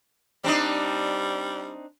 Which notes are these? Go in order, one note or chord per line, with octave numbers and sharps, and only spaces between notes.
G3 C4 D4 D#4